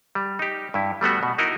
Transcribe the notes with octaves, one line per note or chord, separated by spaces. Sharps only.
G3
D#4 G4
G2 E4
G3 A3 B3 F#4
B2
D#4 E4 F#4 A#4 D#5